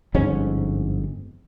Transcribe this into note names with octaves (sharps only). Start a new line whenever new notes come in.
G1 F2 G#2 C#4